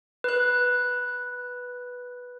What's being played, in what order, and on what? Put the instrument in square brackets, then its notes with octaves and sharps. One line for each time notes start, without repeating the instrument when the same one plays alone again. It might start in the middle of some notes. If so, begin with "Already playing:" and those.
[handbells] B4 F#6